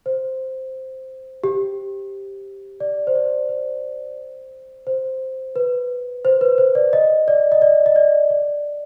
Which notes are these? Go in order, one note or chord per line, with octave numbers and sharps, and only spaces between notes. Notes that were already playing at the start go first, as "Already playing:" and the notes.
C5
G4
D5
C5
D5
C5
C5
B4
C5
B4
C5
D5
D#5
D5
D#5
D5
D#5
D5
D5